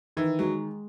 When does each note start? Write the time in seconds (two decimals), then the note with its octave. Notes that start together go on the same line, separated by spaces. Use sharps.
0.17 D#3 E3
0.39 F#3 G#3